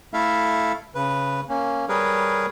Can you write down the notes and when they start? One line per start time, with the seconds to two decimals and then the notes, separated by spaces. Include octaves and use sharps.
0.14 A3 E4 A4 E5 F5
0.95 C#3 B4
1.49 A#3 C#4
1.89 G3 G#4 A#4 B4 C#5